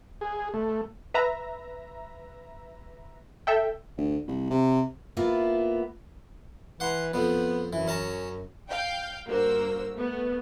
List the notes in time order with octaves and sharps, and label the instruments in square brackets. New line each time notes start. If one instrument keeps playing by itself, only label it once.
[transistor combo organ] G#4
A3
[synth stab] B4 E5 A#5
A4 E5 G5
[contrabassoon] D2
C2
C3
[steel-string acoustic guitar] A#3 B3 E4 F4
[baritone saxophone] E3 [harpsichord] F#5 C6
[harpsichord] F2 F3 [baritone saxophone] B3
[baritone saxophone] F#2 [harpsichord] E3
[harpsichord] C#4 A5 A#5
[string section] F5 G5 G6
G2 A#3 F#4 A#4 C5 E6
A3 B3